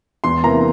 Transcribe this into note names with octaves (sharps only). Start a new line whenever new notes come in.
E2 C6
C3 E3 A#3 A#5